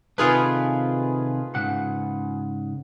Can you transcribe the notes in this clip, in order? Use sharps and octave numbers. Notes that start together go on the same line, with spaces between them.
C3 D#3 A3 F4 G#4 B4
G#2 C#3 F#5